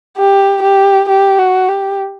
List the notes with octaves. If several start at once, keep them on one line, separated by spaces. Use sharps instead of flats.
G4
G4
G4
F#4
G4